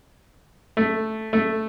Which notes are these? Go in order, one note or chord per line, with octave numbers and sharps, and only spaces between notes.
A3
A3